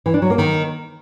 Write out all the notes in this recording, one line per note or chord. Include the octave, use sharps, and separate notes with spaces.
E3
D4
F#3
A#3
D#3